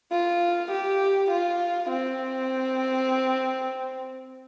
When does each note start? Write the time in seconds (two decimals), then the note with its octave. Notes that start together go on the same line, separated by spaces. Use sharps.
0.12 F4
0.71 G4
1.31 F4
1.90 C4